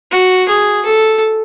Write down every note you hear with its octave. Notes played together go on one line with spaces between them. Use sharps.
F#4
G#4
A4